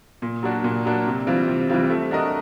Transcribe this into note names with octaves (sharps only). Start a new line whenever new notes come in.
A#2
F#3 A#3 D4 F#4
A#2
F#3 A#3 D4 F#4
C3
E3 G3 C4 F4
C3
E3 G3 C4 F4
A3
D4 F#4 A#4 D#5